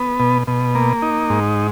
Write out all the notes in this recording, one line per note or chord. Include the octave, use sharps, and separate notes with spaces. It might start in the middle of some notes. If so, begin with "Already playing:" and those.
Already playing: B3
B2
B2
A#3
D#4
G#2